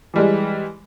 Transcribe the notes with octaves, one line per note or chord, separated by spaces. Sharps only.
E3 G3 G#3